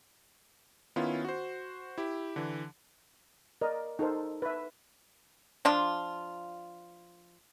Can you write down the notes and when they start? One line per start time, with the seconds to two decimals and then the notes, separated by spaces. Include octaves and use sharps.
0.96 D#3 B3 C#4 E4 F4
1.25 F#4 C5
1.98 E4 G4
2.36 D3 E3
3.61 A#4 D5 D#5
3.99 D#4 A4 A#4 C5
4.42 B4 E5
5.65 F3 D4 F4